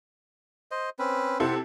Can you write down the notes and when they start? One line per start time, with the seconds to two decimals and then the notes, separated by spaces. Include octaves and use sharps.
0.71 C5 D#5
0.99 C4 C#4 B4
1.40 C3 E4 A4 C5 F#5